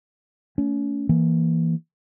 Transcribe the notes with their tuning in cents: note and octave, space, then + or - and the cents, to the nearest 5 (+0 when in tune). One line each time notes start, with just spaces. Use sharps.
A3 +15 C#4 +30
E3 +0 A#3 +0